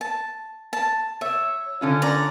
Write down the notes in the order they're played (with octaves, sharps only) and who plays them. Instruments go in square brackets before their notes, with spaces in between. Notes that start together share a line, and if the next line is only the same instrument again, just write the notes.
[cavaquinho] A5
A5
[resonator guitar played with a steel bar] C#5 [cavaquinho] E5
[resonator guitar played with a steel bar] D3 C#4 F4
[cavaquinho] D5 A#5